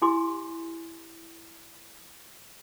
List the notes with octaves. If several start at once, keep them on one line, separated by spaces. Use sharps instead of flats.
E4 G4 G#5 C6 D6